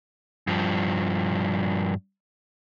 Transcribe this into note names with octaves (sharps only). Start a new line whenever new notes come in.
G2 F3